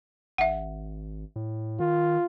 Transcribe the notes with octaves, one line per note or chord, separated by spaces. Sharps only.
G#1 E5 F#5
A2
D#3 F4